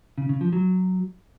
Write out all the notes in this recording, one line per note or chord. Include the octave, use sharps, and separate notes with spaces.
C#3
C#3
F3
F#3